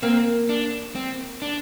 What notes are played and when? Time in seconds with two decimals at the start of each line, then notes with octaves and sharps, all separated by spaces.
0.02 A#3 C4
0.49 D4
0.95 C4
1.42 D4